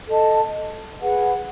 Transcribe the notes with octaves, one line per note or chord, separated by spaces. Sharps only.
A4 D#5 A5
G#4 B4 F#5